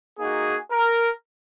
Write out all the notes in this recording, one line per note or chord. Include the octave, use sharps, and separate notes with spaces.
A#3 D#4 F#4 G#4
A#4